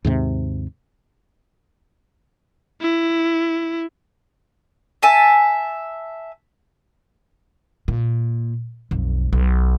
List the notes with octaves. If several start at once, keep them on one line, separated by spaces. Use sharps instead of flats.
D#2 G#2 C3
E4
E5 G#5 A5
A#2
B1 F2
B1